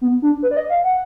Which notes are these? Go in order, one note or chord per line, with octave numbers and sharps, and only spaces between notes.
B3
D4
B4
D5
D#5
F5
F#5